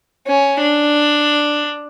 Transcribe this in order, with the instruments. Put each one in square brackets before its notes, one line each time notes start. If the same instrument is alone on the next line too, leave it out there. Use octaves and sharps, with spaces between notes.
[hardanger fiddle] C#4
D4